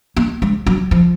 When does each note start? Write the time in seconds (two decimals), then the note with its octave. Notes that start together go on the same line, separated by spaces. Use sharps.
0.16 A#3
0.42 G#3
0.66 F#3
0.91 F3